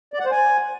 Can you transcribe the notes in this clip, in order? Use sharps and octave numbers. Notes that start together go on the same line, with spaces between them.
D5
F#5
C5
G#5